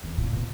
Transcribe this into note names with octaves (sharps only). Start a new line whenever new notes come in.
E2
A#2
B2